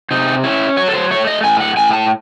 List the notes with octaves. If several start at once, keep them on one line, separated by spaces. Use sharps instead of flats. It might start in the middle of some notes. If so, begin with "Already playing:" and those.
C3 D#4
C#4 E4
F#3 C#5
A4
C5
A3 C#5
D#5
A2 G#5
F#5
A2 G#5
A5